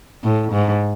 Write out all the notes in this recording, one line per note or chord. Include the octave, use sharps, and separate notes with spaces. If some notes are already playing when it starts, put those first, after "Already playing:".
A2
G#2